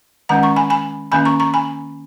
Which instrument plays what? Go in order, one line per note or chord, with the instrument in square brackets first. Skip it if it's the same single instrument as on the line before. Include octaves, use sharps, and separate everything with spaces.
[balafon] D#3 G#3 C#4 F#5 A#5
A#5 C#6
G#5 B5
G#5 B5
D#3 A#3 C#4 G#5 B5
A#5 C#6
A#5 C#6
G#5 B5